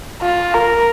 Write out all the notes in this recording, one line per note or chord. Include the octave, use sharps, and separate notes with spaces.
F4
A#4